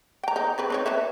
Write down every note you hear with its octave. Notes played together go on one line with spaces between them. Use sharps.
G5 A#5
D#4
C#3 C4 B4
C4 D#4 C#5
B4 C#5 E5